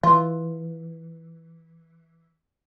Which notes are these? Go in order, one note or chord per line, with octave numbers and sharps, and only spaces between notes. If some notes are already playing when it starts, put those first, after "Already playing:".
E3 F4